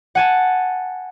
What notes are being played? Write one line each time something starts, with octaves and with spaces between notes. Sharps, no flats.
F#5 G#5 A5